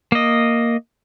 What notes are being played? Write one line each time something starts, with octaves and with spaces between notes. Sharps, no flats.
A#3 D#5